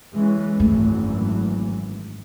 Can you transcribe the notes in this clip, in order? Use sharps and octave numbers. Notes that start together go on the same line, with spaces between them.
E3 G#3 C#4
G#1 F#2 E3 A3